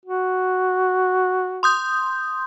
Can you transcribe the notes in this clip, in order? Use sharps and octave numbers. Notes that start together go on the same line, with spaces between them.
F#4
C6 D#6 G6